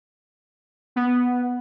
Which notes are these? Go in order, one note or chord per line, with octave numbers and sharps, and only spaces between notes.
B3